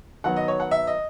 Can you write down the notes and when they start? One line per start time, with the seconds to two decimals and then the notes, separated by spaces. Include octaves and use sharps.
0.24 D#3 F#3 B3 F#5
0.36 D#5
0.48 C#5
0.60 F#5
0.71 E5
0.87 D#5